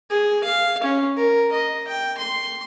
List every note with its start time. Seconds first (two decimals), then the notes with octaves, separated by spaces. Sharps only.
0.10 G#4
0.44 F5
0.84 C#4
1.17 A#4
1.52 D#5
1.88 G5
2.18 C6